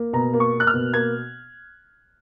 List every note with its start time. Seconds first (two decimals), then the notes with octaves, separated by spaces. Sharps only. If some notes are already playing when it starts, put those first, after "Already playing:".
Already playing: A#3
0.13 B2 A#5
0.33 A#3
0.40 C#6
0.53 A#3
0.60 F#6
0.67 F6
0.73 B2
0.93 A#3 G#6